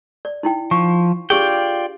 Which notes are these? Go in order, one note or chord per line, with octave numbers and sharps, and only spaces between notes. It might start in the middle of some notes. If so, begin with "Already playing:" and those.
D5
D#4 E4 G5
F3 C#6
D4 F4 G4 G#4 D5 G5